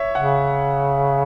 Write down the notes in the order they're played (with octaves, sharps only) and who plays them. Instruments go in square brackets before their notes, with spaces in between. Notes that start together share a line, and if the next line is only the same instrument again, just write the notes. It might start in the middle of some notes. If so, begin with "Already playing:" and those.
Already playing: [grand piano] C#5 E5
[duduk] C#3 [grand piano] F#5